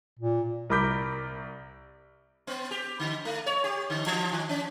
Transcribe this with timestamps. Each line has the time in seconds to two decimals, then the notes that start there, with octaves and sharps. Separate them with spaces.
0.19 A#2
0.70 C2 A#4 B5 D6 G6 B6
2.47 B3
2.71 G4
3.00 D3
3.25 A3
3.46 C#5
3.64 G4
3.90 D3
4.06 E3
4.32 D#3
4.49 C#4